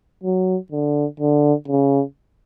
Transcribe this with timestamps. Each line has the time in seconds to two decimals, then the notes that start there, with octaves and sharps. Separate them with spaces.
0.24 F#3
0.72 D3
1.20 D3
1.68 C#3